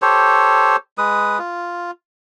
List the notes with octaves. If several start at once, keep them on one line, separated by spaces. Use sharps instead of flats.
G4 A4 C5 C#5
G#3 B4 D#6
F4